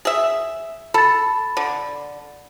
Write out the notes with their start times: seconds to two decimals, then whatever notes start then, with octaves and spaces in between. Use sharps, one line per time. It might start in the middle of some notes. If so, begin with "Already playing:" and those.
0.05 G#4 E5
0.94 A4 B5 A6
1.57 D3